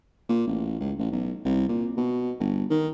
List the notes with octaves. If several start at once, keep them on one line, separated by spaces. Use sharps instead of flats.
A#2
A1
C#2
A1
B1
C2
A#2
B2
G1
D#3